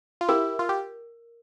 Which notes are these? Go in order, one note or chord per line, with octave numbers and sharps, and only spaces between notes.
F4
E4 G4 A#4
F4
G4